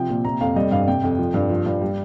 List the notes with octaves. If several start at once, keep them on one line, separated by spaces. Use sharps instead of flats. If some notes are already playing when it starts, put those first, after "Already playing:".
Already playing: C3 F3 G5
A#2
C3 A#5
F2 F5
G3 D#5
G2 F5
C3 G5
F2
F3
G2
F3
G2
G3